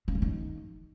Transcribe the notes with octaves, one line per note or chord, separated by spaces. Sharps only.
C#3
F#2
D#3